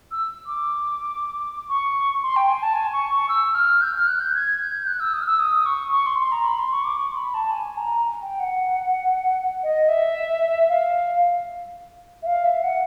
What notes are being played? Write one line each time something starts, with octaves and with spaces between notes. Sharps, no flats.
E6
D6
C#6
C6
G5
G#5
A5
G#5
C#6
C#6
E6
F6
G6
F6
F#6
G6
G#6
G6
F#6
E6
D#6
F6
E6
D#6
C#6
C#6
C6
C6
A#5
B5
C6
C#6
D6
C#6
C6
B5
A5
G#5
A#5
G5
F#5
D#5
E5
F5
E5
F5
E5
F#5